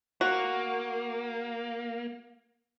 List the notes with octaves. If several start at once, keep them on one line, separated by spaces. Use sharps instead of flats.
A#3 F#4